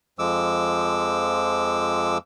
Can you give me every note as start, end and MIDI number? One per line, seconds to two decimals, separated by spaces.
0.19 2.18 41
0.19 2.18 53
0.19 2.18 56
0.19 2.18 86
0.19 2.18 88